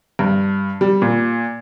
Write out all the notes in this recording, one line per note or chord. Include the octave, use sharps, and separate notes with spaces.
G2
G3
A#2